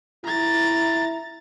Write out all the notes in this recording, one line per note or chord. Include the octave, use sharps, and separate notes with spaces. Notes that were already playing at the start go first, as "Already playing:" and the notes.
E4 A#5 A6